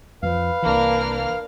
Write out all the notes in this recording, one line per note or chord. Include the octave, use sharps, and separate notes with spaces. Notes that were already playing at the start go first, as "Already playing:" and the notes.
F2 F3 B4 F5
C2 E3 A#3 D4 F6